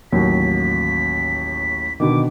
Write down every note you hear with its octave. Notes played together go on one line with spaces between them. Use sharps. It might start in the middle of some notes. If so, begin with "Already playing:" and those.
A1 D#2 F#3 B6
B2 D3 D#3 D6